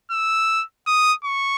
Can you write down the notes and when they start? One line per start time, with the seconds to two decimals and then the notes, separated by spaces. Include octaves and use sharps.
0.11 E6
0.87 D#6
1.24 C#6